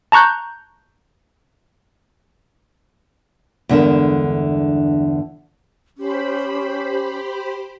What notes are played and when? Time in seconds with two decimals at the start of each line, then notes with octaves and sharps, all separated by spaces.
0.12 A5 A#5 C#6 F#6 G6
3.69 E2 G2 D3 G#3 A#4 E5
5.98 C#4 G4 C5 B5